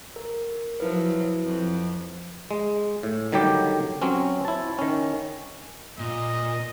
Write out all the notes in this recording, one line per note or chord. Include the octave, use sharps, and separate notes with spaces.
A#4
F3 F#3 E4 B4
F2
G#3
A2
D3 D#3 F#3 G3 G4
F#3 C4 C#4
E4 A5
D#3 C#4
A#2 D#5